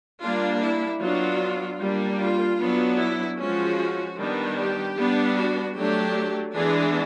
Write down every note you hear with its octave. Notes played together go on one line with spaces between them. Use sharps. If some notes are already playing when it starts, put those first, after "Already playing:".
G3 A#3 D4 F4
E4
F#3 B3 D4 F4
G3 A#3 D4
F4
F#3 B3 D4
E4
F3 G#3 C#4 F#4
D#3 G3 B3 D4
G4
G3 B3 D4
F#4
F#3 A3 D4 G4
E3 G#3 B3 D4 G#4